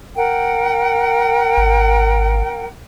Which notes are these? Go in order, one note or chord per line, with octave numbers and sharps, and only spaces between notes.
A#4 F#5 G5
G#1